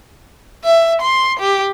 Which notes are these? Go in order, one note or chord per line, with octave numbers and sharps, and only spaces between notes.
E5
C6
G4